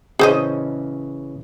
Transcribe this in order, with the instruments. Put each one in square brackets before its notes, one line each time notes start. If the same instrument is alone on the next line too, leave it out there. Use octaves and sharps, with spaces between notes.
[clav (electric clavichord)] C#3 E3 C#4 [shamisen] G#4 C5 D#5